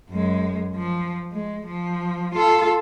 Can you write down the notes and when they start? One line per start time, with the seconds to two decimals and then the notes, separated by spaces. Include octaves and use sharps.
0.10 F#2 G#3
0.75 F3
1.32 G#3
1.66 F3
2.35 F4 A4